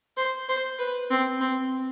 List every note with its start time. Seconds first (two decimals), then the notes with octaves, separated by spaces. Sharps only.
0.17 C5
0.48 C5
0.79 B4
1.10 C4
1.40 C4